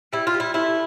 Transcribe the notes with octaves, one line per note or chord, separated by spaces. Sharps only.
G3 E4
F4
G3
E4
A3 E4